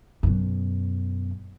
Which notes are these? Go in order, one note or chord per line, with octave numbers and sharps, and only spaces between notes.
F#2 B2